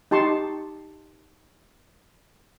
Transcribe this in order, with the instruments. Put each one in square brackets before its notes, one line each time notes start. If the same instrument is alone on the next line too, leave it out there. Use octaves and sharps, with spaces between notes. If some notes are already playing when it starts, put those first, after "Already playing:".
[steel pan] D#4 G4 A5 C6 C#6